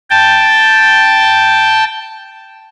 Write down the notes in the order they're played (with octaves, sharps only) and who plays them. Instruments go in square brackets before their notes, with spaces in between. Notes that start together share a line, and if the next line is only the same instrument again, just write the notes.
[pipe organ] G5 A5